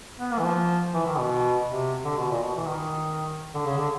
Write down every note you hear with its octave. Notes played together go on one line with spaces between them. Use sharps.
B3
A#3
E3
F3
E3
D#3
B2
C3
D3
B2
A#2
B2
E3
D#3
D3
C#3
D3